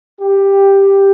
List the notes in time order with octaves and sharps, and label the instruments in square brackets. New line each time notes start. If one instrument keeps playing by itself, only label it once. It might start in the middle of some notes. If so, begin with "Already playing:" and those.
[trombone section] G4